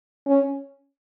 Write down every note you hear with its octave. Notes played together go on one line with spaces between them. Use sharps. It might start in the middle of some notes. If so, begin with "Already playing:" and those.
C#4